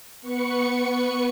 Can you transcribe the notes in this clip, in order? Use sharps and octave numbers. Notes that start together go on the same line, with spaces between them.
B3 B4 C#6 C#7